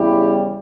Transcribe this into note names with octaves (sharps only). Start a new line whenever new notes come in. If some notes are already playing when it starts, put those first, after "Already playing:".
Already playing: E2 C#3 G3 E4 G4